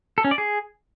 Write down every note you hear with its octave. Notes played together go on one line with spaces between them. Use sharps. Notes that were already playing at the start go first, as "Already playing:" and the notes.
A4
C#4
D5
G#4